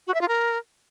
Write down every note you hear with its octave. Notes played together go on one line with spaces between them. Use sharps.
F#4
E5
F4
A#4